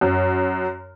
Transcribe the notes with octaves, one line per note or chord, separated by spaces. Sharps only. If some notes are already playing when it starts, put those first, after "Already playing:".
F#2